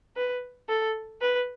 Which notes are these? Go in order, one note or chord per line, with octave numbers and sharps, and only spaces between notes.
B4
A4
B4